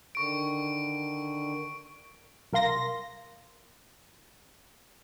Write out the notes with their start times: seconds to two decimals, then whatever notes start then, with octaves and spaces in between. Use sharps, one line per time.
0.15 D3 D#3 C#6 D7
2.53 C2 A#4 F5 C6 A#6